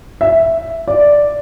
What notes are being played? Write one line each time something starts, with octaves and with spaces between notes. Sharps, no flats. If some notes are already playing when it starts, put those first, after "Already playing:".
E5
D5